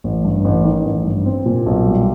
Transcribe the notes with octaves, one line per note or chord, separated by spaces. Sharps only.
A1
G2
A1
D#3
A1
G2
C4
A#2
B1
G3